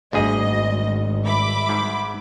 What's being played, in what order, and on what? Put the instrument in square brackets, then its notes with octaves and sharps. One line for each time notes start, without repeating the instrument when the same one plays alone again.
[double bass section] G#1 [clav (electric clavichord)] D2 G#4 [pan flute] G3 [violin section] D#5
[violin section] E5 B5 D6
[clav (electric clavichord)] G#2